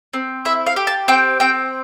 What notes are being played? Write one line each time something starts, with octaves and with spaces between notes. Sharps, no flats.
C4
E4 E5
F5
G4
A5
C4 G5
C4 G5